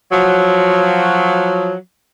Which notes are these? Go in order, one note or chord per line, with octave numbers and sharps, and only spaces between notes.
F3 F#3